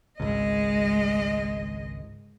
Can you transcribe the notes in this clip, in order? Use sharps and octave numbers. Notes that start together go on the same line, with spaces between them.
G#1 C#2 G#3 D#5